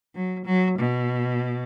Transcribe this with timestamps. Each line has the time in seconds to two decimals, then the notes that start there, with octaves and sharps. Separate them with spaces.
0.15 F#3
0.46 F#3
0.78 B2